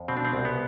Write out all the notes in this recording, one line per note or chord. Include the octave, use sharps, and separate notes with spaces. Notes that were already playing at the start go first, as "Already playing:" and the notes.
Already playing: F2
B2 C4
D4
C4
C2
B3